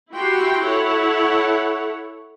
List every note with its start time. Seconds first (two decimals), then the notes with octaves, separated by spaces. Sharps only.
0.12 E4 F#4 G4 G5 C6
0.63 E4 A4 C#5 F#5